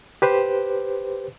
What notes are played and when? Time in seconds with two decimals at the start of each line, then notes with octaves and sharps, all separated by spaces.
0.22 G4 B4 C5